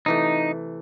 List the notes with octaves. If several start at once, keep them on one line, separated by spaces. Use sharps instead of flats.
C3 E3 A3 D#4